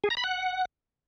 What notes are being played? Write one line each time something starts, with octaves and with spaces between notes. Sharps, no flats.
G#4
A#5
B5
F#5